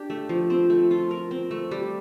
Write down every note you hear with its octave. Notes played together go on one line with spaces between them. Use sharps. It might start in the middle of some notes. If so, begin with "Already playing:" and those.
Already playing: D4 G4
A3
F3
C4
A3
F4
A#4
C4
A3
G3